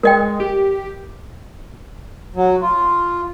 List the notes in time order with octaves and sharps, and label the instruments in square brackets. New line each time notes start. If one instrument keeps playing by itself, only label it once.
[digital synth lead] G#3 [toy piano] A#4 D#5 G5
[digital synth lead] G4
[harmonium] F#3
F4